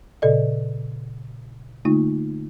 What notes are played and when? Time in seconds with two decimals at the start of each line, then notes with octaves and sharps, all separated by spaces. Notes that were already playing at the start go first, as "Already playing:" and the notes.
0.22 A#2 C#3 A4 D5 D#5
1.85 D3 A3 A#3 D#4 F4